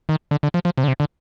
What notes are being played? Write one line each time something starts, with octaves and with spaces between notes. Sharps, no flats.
D#3
D3
D3
F3
F3
C3
D3
C3
D3